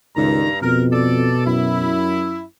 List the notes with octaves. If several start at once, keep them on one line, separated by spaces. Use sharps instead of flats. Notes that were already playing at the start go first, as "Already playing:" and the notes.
C#2 G2 D#3 A#5
F2 B2 A#4
A4 D5
F#2 E4